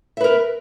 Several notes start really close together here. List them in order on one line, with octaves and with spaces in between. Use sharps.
E5 B4 A#4